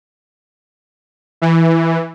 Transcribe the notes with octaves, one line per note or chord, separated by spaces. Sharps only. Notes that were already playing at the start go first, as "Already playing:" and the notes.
E3